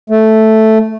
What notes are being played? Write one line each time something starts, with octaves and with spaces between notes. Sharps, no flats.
A3